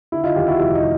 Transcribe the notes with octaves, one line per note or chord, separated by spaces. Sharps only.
D3 E4
D#4 F4
D#2 F4 G4
E4 F#4
F1 E4
D#4